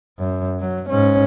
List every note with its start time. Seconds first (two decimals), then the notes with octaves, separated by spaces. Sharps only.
0.19 F#2
0.60 F#3
0.90 G#2 C#4